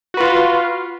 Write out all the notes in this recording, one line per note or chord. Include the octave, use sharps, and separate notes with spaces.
F4 F#4 B4